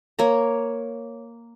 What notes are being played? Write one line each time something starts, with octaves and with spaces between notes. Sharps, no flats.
A#3 C#5 A#5